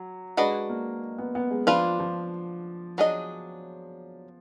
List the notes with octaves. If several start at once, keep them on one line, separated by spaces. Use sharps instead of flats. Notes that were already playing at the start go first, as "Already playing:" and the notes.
Already playing: F#3
G#3 D4 F#4 B4 D#5
A#3
B3
B3
G#3
F3 D4 F4 B4
F3
F#3 D4 G#4 D#5